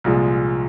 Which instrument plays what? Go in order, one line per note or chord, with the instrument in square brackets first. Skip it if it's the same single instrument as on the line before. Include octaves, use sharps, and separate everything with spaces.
[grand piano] C2 A#2 F3 G#3